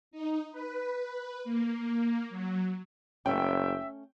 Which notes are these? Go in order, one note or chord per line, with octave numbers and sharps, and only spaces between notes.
D#4
B4
A#3
F#3
F#1 A3 C#4 E5 G5